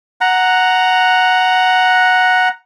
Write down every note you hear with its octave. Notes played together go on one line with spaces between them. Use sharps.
F#5 A#5